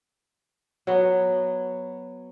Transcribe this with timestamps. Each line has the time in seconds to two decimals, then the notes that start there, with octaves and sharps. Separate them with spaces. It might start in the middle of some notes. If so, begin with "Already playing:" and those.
0.87 F#3 B3